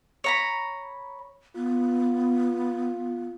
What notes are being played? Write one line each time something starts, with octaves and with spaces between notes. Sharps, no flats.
C#5 A#5 B5
B3 F4